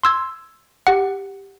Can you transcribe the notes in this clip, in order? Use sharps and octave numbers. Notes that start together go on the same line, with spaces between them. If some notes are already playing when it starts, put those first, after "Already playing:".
C6 E6 G#6
G4 F#5